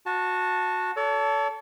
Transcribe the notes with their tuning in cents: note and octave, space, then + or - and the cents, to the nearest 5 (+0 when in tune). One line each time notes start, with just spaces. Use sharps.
F#4 -15 A5 +0
A4 +0 C#5 +45